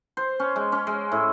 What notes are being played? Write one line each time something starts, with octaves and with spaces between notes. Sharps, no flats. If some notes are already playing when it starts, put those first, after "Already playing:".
C5
C#4
G#3
C#4
G#3
A2